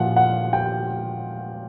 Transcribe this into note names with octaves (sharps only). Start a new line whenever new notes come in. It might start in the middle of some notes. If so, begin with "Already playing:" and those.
Already playing: A#2 F3 F5 F#5
F#5
G5